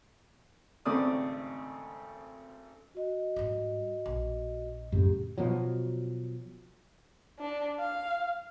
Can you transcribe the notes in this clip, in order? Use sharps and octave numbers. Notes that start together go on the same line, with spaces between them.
G#1 C#3 A3 C4 D5 D#6
F#4 D#5
G#2 G3
A#1
F#2 A2 C#3 G4
B2 F3 F#3
D4
F5